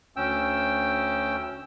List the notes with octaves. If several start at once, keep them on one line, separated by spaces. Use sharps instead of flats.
D2 C#4 G5 E6